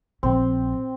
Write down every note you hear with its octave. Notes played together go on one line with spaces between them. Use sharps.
A#1 C4